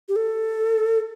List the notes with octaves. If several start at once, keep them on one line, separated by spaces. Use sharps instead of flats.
G4
A4